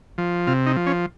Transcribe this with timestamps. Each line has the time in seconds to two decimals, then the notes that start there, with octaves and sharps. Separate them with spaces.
0.18 F3
0.47 C3 F4
0.66 D#4
0.76 F3
0.86 C#4